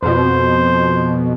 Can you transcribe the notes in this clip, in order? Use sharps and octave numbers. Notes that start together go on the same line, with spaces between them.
F2 B2 C5